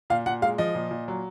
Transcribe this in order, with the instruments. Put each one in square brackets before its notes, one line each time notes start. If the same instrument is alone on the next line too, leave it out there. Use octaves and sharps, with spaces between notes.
[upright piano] A#2 F5
A#2 F#5
G#3 F5
F3 D#5
A#2
A#2
F#3